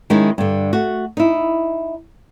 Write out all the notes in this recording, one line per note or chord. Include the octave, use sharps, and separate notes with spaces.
D#3 G#3 C#4 D#4 E4 C#5
G2 D3
A3 F#4
D#4 E4